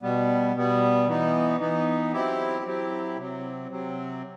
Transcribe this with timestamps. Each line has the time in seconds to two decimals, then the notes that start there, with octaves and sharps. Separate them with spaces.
0.02 B2 G3 B3
0.56 B2 G3 B3
1.07 E3 B3 D#4
1.60 E3 B3 D#4
2.12 F#3 C4 E4 G4
2.64 F#3 C4 E4 G4
3.17 C3 F#3 C4
3.69 C3 F#3 C4